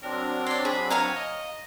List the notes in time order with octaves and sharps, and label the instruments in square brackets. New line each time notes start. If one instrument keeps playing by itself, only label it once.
[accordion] F#3 C4 D4 [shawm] A#4
[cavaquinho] C#5 D5 [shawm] C6
[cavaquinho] G#4 [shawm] B5
[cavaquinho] C#5 F5 A#5 [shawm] G#5
[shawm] D#5